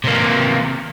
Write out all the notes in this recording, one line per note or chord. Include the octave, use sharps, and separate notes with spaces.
C3 A#3